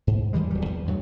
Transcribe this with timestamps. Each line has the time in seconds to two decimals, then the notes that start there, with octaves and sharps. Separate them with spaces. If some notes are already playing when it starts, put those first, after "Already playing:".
0.07 G#2
0.33 D#2 E3 G3 G#3
0.50 D1 F#3 G3
0.65 E2
0.86 D2 G2 F#3